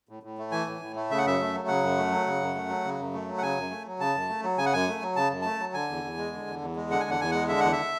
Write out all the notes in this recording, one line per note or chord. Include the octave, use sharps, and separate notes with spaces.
A2
A2
A3
E3 G#5
A2
A2
A3
C#3 E5
F#5
F#2 E5
A3
F#3
C#3 F#5
F#2
A3
F#3
C#3
F#2
A3
F#3
C#3
F#2
A3
F#3
F#5
C#3 G#5
F#2
A3
F#3
C#3 A5
F#2
A3
F#3
C#3 G#5
F#5
F#2 G#5
A3
F#3
C#3 A5
F#2
A3 A5
F#3
D3 G#5
E2
E2
G#3
D3
E2
E2
G#3
D3 F#5
G#5
E2 F#5
E2 G#5
G#3 F#5
D3 E5
E2 F#5
E5